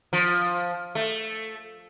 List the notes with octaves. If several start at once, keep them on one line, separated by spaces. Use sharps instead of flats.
F3
A3